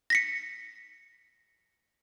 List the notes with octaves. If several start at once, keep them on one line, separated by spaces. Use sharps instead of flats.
A#6 B6 C#7